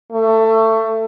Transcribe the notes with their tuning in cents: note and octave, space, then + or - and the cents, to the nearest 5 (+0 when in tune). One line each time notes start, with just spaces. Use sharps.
A3 +20